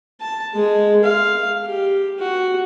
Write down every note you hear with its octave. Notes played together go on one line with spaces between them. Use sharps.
A5
G#3 G#4
F5
G4
F#4